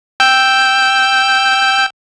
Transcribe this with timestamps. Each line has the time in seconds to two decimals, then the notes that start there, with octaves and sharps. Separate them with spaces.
0.20 G5 E6 G6